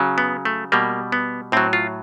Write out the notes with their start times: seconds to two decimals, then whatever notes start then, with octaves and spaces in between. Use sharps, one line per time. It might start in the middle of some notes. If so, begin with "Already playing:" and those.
Already playing: C#3 F#3
0.18 B3
0.45 A3
0.72 B2 G3 A#3
1.12 B3
1.52 A2 F#3 C4
1.73 F4